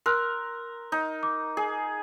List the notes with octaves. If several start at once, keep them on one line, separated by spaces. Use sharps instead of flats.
A#4 C6 E6 F#6
D#4
D6
G#4